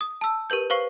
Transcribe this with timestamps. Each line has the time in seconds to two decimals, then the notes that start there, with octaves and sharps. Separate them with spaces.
0.01 D#6
0.21 A5 E6
0.50 G4 A#4 B4 G6
0.70 B4 C5 F5 C#6 C7